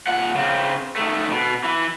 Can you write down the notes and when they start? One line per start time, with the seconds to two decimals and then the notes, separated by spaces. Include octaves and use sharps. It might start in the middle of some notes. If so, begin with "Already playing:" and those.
0.07 A#2 F#5
0.36 C#3 C4
0.96 D#3 A3
1.32 B2
1.64 E3